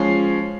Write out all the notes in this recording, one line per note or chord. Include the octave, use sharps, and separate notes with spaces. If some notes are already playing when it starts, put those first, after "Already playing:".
Already playing: F3 G#3 C#4 C7